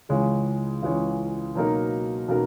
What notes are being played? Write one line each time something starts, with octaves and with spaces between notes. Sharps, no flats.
C#2 C#3 E3 G#3 C#4
C#2 C#3 E3 G#3 C#4
B2 F#3 A#3 D#4 A#4
B2 F#3 A#3 D#4 A#4